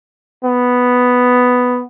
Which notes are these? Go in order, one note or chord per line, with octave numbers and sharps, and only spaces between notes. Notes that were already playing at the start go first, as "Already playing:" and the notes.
B3